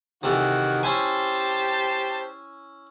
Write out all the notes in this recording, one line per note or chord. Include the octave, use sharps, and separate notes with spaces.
C3 D#3 E3 F#4 A4
C#4 E4 G4 C5 G#5 A5